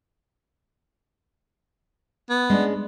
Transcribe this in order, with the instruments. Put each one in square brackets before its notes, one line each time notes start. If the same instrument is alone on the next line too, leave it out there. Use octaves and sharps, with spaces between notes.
[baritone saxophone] B3
[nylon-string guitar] G#3 C#4 D4